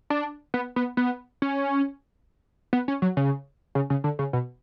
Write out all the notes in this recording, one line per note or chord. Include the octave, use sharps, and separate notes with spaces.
D4
B3
B3
B3
C#4
B3
C#4
F#3
C#3
C#3
C#3
D3
C#3
B2